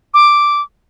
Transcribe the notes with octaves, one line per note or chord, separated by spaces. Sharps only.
D6